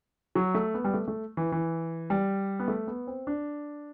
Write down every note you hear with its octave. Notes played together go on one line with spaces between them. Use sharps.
F#3
A3
B3
G3
A3
A3
E3
E3
G3
B3
A3
B3
C4
D4